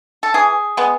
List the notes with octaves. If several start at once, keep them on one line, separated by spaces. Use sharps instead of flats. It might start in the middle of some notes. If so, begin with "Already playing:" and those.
A4
E3 G#4
G#3 B3